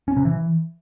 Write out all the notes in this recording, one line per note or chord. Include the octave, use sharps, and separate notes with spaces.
C#4
C3
E3